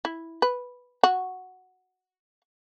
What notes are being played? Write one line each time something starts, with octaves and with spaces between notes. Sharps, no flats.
E4
B4
F#4